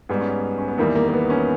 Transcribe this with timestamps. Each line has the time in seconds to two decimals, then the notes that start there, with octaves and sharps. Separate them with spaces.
0.09 G#2 G3 B3
0.21 C#4
0.58 C#4
0.68 B3
0.78 E2 D#3 G3 A#3
0.95 A#3
1.09 A#3
1.13 B3
1.30 C#4